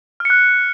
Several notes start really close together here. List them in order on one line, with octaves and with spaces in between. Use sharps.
F6 C#7 F#6